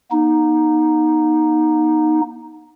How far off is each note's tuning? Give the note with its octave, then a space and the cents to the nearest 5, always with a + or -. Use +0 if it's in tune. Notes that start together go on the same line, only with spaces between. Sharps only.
B3 -45 D#4 +0